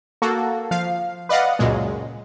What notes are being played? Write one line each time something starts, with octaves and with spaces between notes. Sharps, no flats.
A#3 F#4 A4
F3 F5
B4 D5 D#5 F5 F#5
C#2 F#2 A#2 G#3